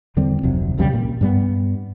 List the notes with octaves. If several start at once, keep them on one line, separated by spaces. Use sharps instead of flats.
E2 D3 G3 C4
F1 D2 C3 F#3
B1 E2 C#3 G3
A#2
G2 G3 B3